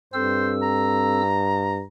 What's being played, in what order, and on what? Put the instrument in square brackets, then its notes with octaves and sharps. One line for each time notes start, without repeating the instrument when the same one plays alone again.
[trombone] G2 [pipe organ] C4 A4 E6 [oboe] C5
[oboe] A#5